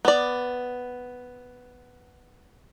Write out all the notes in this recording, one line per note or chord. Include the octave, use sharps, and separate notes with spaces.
B3 D5